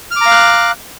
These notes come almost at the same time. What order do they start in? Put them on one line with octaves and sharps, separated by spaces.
F6 D6 A#5 F5 F#6